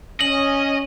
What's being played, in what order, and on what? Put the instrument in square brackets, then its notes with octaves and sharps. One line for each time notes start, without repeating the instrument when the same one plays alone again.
[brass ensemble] C#4 [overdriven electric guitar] D#5 [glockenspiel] F#7